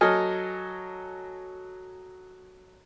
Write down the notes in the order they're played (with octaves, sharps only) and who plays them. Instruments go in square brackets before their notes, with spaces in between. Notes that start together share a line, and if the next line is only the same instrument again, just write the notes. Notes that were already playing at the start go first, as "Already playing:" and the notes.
[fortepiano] F#3 A4 D#5 G#5 F6